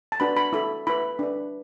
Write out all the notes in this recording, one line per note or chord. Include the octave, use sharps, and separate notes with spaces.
A5
D4 F#4 B4 B5
B5
E4 A4 B5
E4 B4 B5
D4 B4